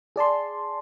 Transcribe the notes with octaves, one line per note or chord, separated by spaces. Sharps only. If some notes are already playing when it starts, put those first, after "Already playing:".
G#4 D5 A5 C6